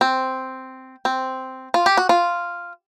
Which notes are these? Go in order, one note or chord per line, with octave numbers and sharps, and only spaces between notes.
C4
C4
F4
G4
F#4
F4